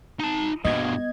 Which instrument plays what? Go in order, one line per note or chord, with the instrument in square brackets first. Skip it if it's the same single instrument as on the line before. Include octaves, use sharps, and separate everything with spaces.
[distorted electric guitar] D#4 A5
[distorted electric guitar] G2 B2 [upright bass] B3 [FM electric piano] D#5 G#6